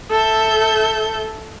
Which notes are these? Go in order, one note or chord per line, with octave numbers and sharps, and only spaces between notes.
A4 E5 G6